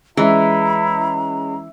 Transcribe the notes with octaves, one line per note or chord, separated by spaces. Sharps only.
E3 G#3 C#4 E4 A#5